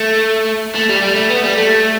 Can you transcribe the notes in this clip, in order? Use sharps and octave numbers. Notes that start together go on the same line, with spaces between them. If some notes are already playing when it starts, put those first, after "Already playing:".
Already playing: A3
A3
G3
G3
A3
B3
G3
A3